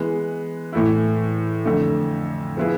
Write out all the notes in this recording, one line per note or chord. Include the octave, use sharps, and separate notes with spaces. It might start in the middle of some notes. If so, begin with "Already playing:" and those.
Already playing: E3 G#3 B3
A2 E3 A3 E4
F2 D3 A3
F3 B3 E4 G#4